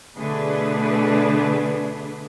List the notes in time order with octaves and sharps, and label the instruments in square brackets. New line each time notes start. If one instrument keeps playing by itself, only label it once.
[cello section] B2 D3 A3 D4 G#4 B4